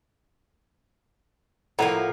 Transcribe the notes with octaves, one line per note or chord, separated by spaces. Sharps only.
A2 F3 A#3 E4 F#4 F#5 A#5